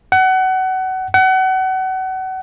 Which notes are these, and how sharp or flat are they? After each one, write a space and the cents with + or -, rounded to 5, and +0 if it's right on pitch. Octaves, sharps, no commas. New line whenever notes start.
F#5 +25
F#5 +30